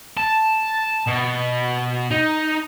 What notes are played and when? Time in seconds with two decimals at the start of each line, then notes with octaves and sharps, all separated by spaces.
0.17 A5
1.07 B2
2.11 D#4